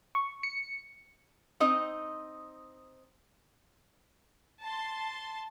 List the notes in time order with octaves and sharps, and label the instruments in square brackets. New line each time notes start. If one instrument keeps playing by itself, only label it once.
[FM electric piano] C#6
C#7
[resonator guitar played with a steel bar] C4 D#4 D#5
[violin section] A5 C6